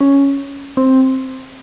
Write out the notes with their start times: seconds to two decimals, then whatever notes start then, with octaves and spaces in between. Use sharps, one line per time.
0.01 C#4
0.77 C4